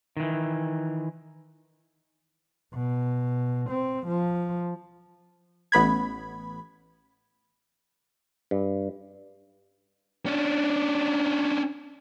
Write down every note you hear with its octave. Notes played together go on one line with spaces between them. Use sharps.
D#3 E3
B2
C4
F3
A1 B3 B5 G#6
G2
C#4 D4